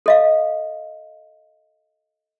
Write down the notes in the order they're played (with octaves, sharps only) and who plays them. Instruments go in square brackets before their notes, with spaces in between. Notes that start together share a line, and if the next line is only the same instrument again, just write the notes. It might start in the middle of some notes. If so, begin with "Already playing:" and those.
[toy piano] A4 D#5 F5